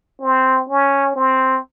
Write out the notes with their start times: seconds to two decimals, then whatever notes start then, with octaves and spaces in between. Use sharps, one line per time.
0.21 C4
0.69 C#4
1.16 C4